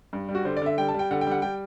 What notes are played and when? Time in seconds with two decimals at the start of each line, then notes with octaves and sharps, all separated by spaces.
0.13 G2
0.29 G3
0.35 F#4
0.45 D3 C5
0.57 D5
0.62 D3 E5
0.78 G3 G5
0.88 A5
0.94 G3
0.99 G5
1.11 D3 F#5
1.21 G5
1.27 G3 F#5
1.42 G3 G5